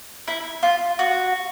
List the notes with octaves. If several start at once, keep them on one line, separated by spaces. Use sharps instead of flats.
E4
F4
F#4